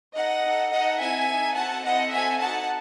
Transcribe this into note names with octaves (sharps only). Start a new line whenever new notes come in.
D#4 A4 D#5 F#5
D#4 A4
D#4 A4 D#5 F#5
C4 E4 A4 E5 G#5
D#4 A4
C4 F#4 A4 F#5 A5
C4 E4 A4 D#5 F#5
C4 F#4 A4 E5 G#5
D#4 F#4 A4 F#5 A5